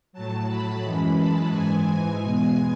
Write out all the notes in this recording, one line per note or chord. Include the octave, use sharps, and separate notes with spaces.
A2 F#3 A5
B5
F#2 E3 G#3
A5
G#2 E3 G#3 G#5
E2 B2 G#3